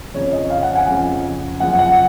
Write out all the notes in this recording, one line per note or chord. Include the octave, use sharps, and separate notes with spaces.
F2 C#3 F3 C#5
D#5
F5
F#5
G#5
F2 C#3 F3
F#2 C#3 F3 F#5
F#5